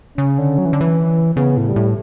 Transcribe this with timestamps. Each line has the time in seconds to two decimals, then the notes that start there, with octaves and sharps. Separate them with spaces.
0.18 C#3 C#4
0.38 D3
0.58 F#3
0.65 E3
0.73 D3
0.81 E3
1.36 C#3 B3
1.57 A2
1.67 G3
1.76 A2